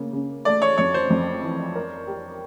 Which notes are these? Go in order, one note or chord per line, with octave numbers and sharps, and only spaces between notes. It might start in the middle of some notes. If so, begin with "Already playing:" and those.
Already playing: C#3 A#3
C#3
A3 D5
C#5
F2 C#5
C5
F2
E3
A#4
G4